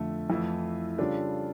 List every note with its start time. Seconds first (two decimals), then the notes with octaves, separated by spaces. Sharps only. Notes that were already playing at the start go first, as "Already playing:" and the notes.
Already playing: F2 D3 A3
0.30 F2 E3 A3 E4
0.98 C#3 G3 D4 F4 A4